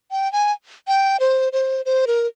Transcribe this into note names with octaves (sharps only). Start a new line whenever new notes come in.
G5
G#5
G5
C5
C5
C5
A#4